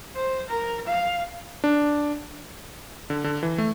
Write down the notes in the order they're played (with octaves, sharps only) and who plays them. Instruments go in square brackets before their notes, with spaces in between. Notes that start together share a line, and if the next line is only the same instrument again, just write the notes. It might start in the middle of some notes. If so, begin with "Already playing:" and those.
[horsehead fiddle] C5
A#4
F5
[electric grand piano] D4
D3
D3
E3
A3